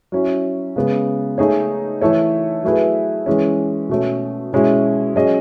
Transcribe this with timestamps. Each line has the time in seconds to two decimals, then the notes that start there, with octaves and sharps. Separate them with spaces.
0.12 F#3 C#4 E4
0.76 C#3 G#3 B3
1.38 A3 D#4 G#4 C#5
2.01 E3 A3 E4 A4 C#5
2.63 F#3 A3 E4 G#4 B4
3.26 E3 G#3 C#4
3.89 B2 A3 C#4
4.53 B2 G#3 C#4 E4
5.15 F#3 C#4 G#4 D#5